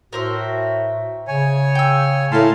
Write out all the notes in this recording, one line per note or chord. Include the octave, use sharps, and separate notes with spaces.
A2 F#4 A#4 C5 E5
C#3 C#5 G#5
G5 E6
A2 A#4 F5 A5 B5 C6